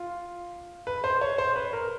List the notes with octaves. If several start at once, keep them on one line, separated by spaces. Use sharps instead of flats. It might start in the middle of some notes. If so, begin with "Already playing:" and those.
Already playing: F4
B4
C5
C#5
C5
B4
A#4